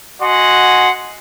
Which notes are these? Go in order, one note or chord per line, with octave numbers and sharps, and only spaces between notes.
F#4 D#5 F#5 G#5 C6